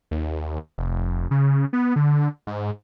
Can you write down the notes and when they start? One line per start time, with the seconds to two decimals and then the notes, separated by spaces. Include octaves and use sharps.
0.11 D#2
0.78 F1
1.31 C#3
1.73 B3
1.96 D3
2.47 G#2